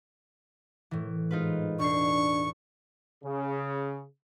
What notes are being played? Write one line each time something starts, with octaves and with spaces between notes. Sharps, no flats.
A2 E3
G#2 D#4 F4 B4
E1 D4 C#6 C7
C#3